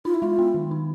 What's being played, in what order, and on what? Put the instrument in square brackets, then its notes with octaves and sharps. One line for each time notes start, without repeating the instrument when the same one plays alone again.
[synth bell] D#4 [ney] F4
[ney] E4
[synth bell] G#3 [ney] F4
[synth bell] B3
D#3
D#4